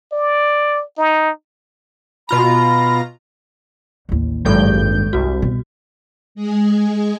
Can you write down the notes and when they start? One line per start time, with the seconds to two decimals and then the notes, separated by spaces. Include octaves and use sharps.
0.12 D5
0.97 D#4
2.29 B2 F4 A#5 B5
4.09 A1 D#2
4.45 G#1 G2 F#3 G#3 A4 G6
5.13 C2 F#4
5.42 B2
6.35 G#3 G#4